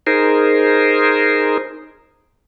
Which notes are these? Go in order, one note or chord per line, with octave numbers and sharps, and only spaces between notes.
D#4 G#4 A#4 C5